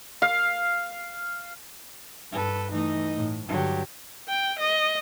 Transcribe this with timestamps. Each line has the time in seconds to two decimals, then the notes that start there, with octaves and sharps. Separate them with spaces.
0.22 F5
2.32 G2 A4 B4
2.71 E3 A3 D#4 D#5
3.16 A2
3.48 G2 D3 F#3 G4
4.28 G5
4.59 D#5